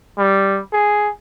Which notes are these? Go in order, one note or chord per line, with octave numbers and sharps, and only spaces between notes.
G3
G#4